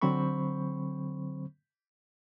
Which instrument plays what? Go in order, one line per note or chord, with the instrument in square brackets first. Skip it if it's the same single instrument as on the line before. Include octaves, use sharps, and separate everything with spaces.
[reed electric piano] D3 F#3 C4 C5 B5 C#6